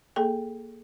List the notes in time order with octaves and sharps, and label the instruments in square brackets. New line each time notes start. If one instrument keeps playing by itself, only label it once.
[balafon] A#3 G#4 A4 G5